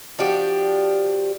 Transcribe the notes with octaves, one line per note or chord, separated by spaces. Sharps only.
F3 D4 F#4 G4